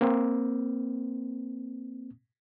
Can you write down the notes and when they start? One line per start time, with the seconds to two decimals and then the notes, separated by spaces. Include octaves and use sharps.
0.01 A#3 C4